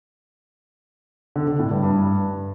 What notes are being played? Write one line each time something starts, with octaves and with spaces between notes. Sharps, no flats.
D3
D3
A2
G2
G2